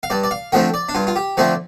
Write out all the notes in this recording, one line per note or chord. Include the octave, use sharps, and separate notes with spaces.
F5
G2 D5
D5
F5
D3 F3 A3 C4 G5
D5
D4
G2 F4
F4
G4
D3 F3 A3 C4 D5